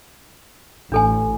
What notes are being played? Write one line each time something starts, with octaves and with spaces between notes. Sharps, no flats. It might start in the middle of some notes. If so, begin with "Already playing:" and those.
A1 D4 A4 G#5